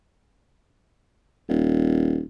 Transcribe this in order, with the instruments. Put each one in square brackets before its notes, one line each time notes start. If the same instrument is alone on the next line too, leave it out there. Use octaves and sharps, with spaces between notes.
[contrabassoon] D#1